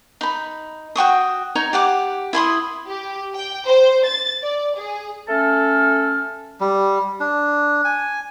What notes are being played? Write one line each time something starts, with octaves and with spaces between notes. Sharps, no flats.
D#4 B5
F#4 G5 C#6 D#6
D#4 C#5 A#5
G4 F#5 D6
E4 B5 C6 D#6
G4
G5
C5
A6
D5
G#4
A3 C#4 A4 F6
G3
D4
G#5